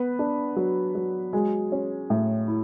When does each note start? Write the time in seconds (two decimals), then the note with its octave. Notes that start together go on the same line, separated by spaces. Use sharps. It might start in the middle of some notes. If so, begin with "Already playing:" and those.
Already playing: B3 B4
0.19 D4
0.56 F#3
0.95 F#3
1.33 F#3 G#3 G#4
1.72 C#4
2.10 A2
2.48 E4